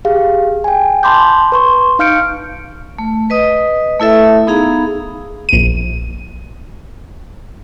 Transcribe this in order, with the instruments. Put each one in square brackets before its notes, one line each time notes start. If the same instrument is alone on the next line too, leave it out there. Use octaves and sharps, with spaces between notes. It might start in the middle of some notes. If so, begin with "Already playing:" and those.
[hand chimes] G4 G#4 F5
G5 G#5
A5 B5 C6 D6 G6
B4 C6 C#6
D#4 F5 F6 G6 C#7 D7
[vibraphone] A3
B4 D#5 D#6
A3 E4 A4 E5
B3 D#4 G#4 F5 A#5 B5
[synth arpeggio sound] A#1 D#7